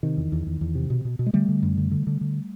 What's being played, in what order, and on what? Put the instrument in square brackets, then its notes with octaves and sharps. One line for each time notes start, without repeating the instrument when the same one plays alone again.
[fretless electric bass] C3 D#3
E2
E2
E2
E2
C3
B2
B2
B2
G#3
D3 G3 A3
D3
F#2
D3
D3
D3
D3